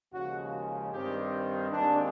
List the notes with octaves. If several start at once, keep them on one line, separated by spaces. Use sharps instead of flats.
D#2 C#3 F3 G#3 F#4
G2 D#3 G3 C4 G4
D#2 D#3 G#3 C4 D4